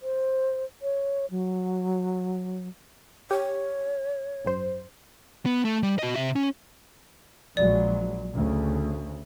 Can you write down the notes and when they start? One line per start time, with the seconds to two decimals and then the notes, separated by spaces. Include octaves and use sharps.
0.02 C5
0.82 C#5
1.31 F#3
3.31 G4 C#5
4.44 G#1 F#2 C5
5.46 B3
5.65 A3
5.83 G3
5.99 F#4 D#5
6.16 C3 E5
6.36 C#4
7.57 A#1 F#3 G#3 D5
8.34 D2 C#3